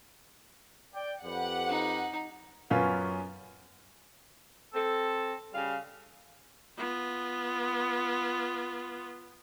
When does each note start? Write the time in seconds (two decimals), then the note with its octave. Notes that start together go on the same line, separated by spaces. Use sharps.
0.94 D5 G5
1.25 F2 G4 B4 F#5
1.69 D#4
2.70 F#2 B3 C#4 F4 F5
4.74 C4 A4
5.53 C#3 G3 F5
6.78 B3 F4